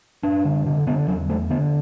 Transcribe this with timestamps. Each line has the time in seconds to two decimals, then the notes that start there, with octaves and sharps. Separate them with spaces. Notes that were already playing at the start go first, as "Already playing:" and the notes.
0.23 F#2 D4
0.45 D3
0.66 D3
0.87 D3 B3
1.08 E2 F#3
1.29 E2 A3
1.50 D3 B3